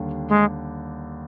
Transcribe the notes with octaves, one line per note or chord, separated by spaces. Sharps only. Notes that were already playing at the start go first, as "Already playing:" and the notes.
Already playing: D#2 D3 G3
G#3